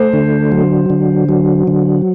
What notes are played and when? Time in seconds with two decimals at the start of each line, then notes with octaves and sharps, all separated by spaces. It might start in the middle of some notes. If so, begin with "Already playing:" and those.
Already playing: A3 C5
0.13 D3
0.52 F#3
0.90 D3
1.29 F#3
1.67 D3